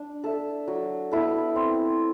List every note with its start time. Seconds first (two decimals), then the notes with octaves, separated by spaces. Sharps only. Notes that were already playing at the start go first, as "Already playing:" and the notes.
Already playing: D4
0.24 A4 E5
0.68 F#3
1.11 B3 E4 A4
1.56 C4